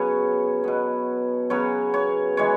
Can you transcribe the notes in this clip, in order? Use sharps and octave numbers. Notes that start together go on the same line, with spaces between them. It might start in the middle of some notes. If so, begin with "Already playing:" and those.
Already playing: C#3 F#3 B3 C#5
B2 B3
C#3 F#3 B3 C#5
C#5
E3 G#3 C#5